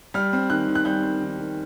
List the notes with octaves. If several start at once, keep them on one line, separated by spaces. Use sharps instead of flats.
G3 F6
C4
D#3 F#6
D#3
F#6
G3 G6
C4
D#3
D#3